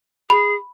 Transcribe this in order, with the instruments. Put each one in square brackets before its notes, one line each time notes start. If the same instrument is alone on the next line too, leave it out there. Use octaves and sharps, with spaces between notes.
[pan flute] G#4 [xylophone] B5